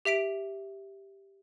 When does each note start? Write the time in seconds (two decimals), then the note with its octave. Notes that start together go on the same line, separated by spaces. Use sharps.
0.05 G4 E5 B6 D7